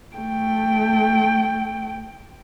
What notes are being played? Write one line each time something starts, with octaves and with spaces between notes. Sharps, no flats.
A3 G5